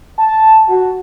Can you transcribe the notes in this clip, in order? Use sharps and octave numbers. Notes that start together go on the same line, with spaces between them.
A5
F#4